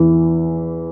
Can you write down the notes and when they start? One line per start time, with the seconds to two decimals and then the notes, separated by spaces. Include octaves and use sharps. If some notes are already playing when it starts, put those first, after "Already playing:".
Already playing: E2 E3